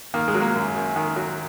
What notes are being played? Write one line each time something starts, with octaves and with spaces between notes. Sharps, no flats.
D#3 A#3
G#3
F#3
A#3
F#2
F#2
D#3
F#3